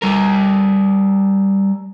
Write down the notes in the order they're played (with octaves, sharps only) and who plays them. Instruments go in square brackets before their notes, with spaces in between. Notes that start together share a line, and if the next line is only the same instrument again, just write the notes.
[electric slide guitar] G3 A#4